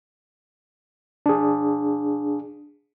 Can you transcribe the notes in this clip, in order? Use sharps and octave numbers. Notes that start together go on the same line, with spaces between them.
D4 G#4